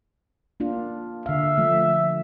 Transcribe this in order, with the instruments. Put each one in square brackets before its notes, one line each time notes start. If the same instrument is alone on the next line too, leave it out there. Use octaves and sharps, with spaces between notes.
[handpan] A#3 D4 F4
[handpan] D3 F5 [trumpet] E5
[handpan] F3 A3